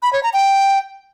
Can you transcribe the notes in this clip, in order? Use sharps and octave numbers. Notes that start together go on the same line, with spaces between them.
B5
C#5
A#5
G5